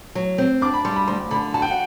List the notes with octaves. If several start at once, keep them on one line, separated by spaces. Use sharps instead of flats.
F#3
C4
D4 D6
B5
G3 C6
B5
D2 C6
D3 B5
F#4 A5
G5
F#5